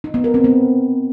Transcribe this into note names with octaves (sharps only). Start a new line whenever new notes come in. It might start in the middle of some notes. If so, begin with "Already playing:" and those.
D#4
B3
A#4
C4
B3